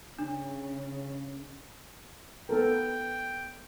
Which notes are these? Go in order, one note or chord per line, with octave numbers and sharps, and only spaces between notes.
C#3 D4
B3 A4 A#4 G5